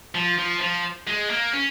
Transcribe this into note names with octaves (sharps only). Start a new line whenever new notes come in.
F3
F3
F3
G#3
A#3
C#4